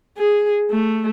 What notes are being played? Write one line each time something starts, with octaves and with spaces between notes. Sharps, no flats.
G#4
A3